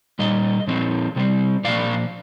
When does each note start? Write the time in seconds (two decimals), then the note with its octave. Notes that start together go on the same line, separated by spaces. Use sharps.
0.19 A#2 G3 D#5
0.67 A#2 F3 C4
1.16 C3 G3 C4
1.64 A#2 F3 A#3 D5 F5